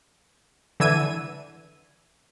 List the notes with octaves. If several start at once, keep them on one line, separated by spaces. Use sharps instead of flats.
D3 E3 E6 G#6 D#7